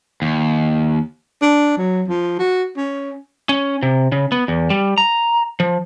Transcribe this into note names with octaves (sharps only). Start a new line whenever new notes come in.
D#2
D4
F#3
F3
F#4
C#4
C#4
C3
C#3
B3
E2
G3
A#5
F3